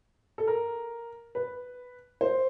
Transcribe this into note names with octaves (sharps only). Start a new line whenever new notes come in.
A4
A#4
B4
C5